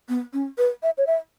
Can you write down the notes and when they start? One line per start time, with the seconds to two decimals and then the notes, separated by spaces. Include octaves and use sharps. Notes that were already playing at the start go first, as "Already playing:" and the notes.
0.09 B3
0.33 C#4
0.58 B4
0.83 E5
0.98 C#5
1.07 E5